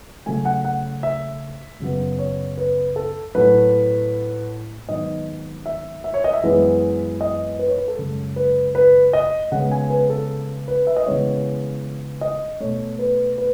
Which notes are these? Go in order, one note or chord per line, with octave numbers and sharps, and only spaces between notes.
C#3 F#3 A3 G#5
F#5
F#5
E5
F#2 C#3 F#3 B3
C#5
B4
A4
A2 F#3 A3 B4
G#2 D#3 F#3 B3 D#5
E5
E5
C#5
D#5
E5
F#2 E3 G#3 B3
D#5
B4
C#5
B4
A4
F#2 C#3 G#3
B4
B4
D#5
C#3 G#3 B3 F#5
G#5
B4
A4
B4
E5
D#5
C#3 E3 G#3 B3 C#5
D#5
B2 A3 C#5
B4
B4